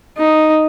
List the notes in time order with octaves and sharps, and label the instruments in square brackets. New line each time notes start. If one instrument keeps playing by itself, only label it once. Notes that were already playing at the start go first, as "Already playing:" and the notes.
[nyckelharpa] D#4